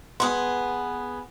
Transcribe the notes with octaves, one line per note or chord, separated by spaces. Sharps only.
B3 G#4 C6 D#6